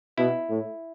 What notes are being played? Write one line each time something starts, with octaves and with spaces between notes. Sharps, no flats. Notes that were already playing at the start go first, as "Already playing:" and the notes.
B2 E4
A2